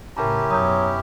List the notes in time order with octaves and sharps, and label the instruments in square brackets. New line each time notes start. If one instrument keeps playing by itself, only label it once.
[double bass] A2 C#3 [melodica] C#4 E4 G4 [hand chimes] A#4 A5 A#5
[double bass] F#2 B2 [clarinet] F#3 [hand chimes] D#6 G6